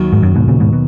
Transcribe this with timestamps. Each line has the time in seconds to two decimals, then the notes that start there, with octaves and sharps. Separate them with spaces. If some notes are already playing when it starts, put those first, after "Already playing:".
Already playing: D#2 D#3 F#3
0.13 G#2
0.23 F#2
0.35 G#2 B2
0.48 A#2 C#3
0.60 G#2 B2
0.73 B2